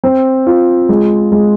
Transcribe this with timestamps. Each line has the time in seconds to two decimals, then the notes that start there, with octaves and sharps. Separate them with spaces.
0.04 C4
0.47 F4
0.89 G#3
1.32 G#3